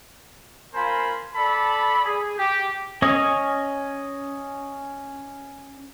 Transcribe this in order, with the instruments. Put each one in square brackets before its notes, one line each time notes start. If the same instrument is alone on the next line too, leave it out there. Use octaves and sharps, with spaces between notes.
[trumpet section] A#3 F4 A#4 C5 G#5 B5
A4 D5 A5 B5
G#4
G4
[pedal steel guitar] C#4 C#5 D#5